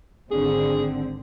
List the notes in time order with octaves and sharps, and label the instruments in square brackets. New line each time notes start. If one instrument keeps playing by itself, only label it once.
[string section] G#1 D3 C4 [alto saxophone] G#4